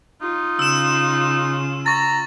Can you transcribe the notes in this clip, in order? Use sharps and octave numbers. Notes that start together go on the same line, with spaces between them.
D#4 F4
C#3 E6 E7
A#5 C#6 A6